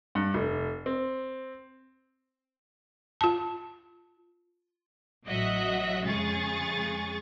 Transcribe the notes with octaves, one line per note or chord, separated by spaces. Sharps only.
G2
F1
C4
F4 A5
A1 F#3 D#5 E5 F#5 F#6
F2 C#3 G#3 G#4 C#6 A6